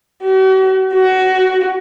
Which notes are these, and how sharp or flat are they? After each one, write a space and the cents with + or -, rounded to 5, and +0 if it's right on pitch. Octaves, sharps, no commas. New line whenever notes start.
F#4 +45
F#4 +20